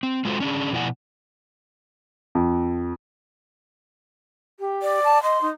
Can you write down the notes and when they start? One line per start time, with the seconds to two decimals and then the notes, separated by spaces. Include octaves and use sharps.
0.03 C4
0.25 G#3 F4 F#4 A4 C5
0.40 C#4 D4 G#4
0.73 B2 F3 E4 D5 F#5 G#5
2.35 F2
4.60 G4
4.82 D5
5.03 A5
5.23 D#5 C6
5.41 D#4